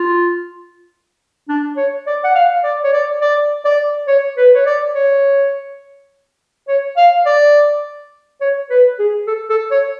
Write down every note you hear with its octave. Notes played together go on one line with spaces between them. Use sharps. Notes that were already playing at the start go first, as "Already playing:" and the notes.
Already playing: F4
D4
C#5
D5
F#5
F5
D5
C#5
D5
D5
D5
C#5
B4
C#5
D5
C#5
C#5
F5
D5
C#5
B4
G#4
A4
A4
C#5